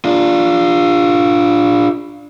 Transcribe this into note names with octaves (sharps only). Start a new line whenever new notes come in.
D4 F4